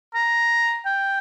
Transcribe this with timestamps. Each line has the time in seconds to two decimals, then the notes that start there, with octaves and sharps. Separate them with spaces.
0.14 A#5
0.86 G5